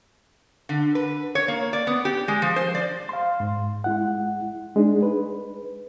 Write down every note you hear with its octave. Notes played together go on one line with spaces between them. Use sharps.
D3
B4
C#5
A#3
D5
B3
G4
G#3
F3
C5
D5
F5 C6
G#2
G#3 E4 F#5
G#3 D4 D#4 G#4
B4